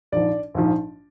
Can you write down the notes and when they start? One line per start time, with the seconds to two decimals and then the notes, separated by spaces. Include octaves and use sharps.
0.12 A#1 G#2 F3 D5
0.54 A#1 G#2 F3